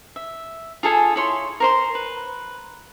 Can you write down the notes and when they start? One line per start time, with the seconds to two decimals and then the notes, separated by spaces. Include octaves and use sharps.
0.16 E5
0.83 F4 G#4 A4 G#5
1.16 E4 C#5 C6
1.60 A#4 C5 C6
1.95 B4